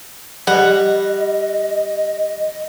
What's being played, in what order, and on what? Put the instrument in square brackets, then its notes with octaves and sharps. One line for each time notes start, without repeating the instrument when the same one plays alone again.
[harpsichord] G3 [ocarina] D#5 [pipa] F#5